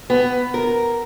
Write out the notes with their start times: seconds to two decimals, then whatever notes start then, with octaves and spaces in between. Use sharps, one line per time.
0.10 B3
0.54 A#4